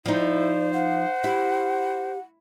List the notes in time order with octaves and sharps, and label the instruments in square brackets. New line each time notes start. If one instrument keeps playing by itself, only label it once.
[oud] F3 D#4 [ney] E4 [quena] C5 [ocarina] D5
[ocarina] F5 [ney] F#5
[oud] E4 [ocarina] G4